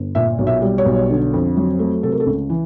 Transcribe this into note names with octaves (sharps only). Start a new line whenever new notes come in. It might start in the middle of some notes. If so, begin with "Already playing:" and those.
Already playing: G1
A#2 E5
B1
E5
G3
C#5
B1
D3
F2
F#3
A3
C3 A4
A#4
A4
C#2
E3